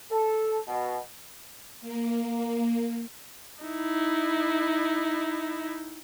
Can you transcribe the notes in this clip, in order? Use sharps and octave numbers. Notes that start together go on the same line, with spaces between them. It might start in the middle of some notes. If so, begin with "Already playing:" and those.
A4
B2
A#3
D#4 E4